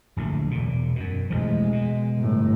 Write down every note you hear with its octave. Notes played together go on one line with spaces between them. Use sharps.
D1 A#1 A2
E1 A#2
F#2 B2
E1 A1 F3 G#3
B2
G1 A2